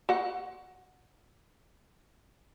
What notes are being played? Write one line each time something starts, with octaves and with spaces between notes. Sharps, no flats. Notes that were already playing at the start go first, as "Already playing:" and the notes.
F#4 F#5